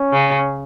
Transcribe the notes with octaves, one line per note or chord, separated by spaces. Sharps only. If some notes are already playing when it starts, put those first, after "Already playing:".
Already playing: C#4
C#3